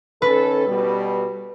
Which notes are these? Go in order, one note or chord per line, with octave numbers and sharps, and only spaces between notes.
D#3 C#4 A4 B4
B2 G3